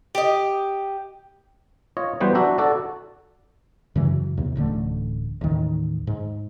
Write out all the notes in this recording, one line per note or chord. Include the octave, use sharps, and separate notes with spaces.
G4 D#5
F4 C#5 D#5
E3 F#3 G3 B3 B4 C5
D4 F#4 E5 A#5
F#4 A4 D5 A5
F#2 C#3 E3 F#3
D#2 C3
D1 A1 D3 A3
A1 D#2 D#3
G#2